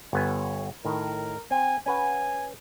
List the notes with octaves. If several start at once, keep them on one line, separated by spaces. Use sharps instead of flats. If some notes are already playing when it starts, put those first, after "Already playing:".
G1 B3 C#5 G#5
A2 D#3 A#4
C4 G#5
C#4 B4 F#5 G#5